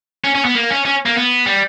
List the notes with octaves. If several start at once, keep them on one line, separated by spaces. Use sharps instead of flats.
C#4
C#4
B3
A#3
C#4
C#4
A#3
B3
G3